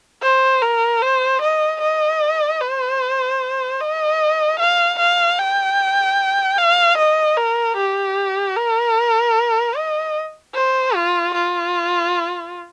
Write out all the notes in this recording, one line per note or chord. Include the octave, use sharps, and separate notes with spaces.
C5
A#4
C5
D#5
D#5
C5
D#5
F5
F5
G5
F5
D#5
A#4
G4
A#4
D#5
C5
F4
F4